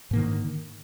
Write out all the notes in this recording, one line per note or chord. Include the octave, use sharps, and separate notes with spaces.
G#2 D3 D#3 A#3